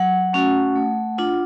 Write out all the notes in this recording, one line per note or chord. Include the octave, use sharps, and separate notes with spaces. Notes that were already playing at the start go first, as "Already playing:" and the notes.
Already playing: F#3 F#5
A3 C#4 F#4
A3
D4 F4